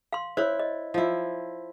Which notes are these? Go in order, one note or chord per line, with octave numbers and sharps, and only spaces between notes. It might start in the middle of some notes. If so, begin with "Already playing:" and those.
F5 C6
E4 C5 C#5
D#5
F3 E4